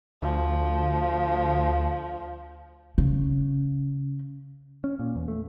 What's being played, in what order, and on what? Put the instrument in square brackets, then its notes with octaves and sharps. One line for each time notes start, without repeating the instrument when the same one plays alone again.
[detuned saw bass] D2 [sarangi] F3
[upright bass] C#3
[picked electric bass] C#4
A#2
E2
A3